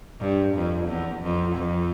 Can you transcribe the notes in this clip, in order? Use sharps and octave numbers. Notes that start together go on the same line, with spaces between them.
G2
F2
E2
F2
F2